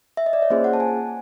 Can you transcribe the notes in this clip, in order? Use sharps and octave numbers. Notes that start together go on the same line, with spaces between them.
E5
D#5
D5
C#5
A#3 C#4 F4 G#4 C5
F#5
A5
G#5